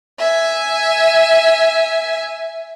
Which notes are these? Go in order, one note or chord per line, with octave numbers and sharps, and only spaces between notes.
E5 G#5